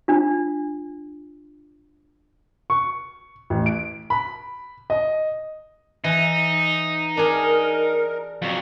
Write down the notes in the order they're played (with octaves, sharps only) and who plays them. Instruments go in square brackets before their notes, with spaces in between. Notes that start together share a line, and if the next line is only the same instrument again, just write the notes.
[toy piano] D4 F4
[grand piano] C#6
A1
D7
B5
D#5
[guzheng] E3 [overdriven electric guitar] D#4
[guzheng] D4 G#4 [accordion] A#4
[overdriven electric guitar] F2 F#3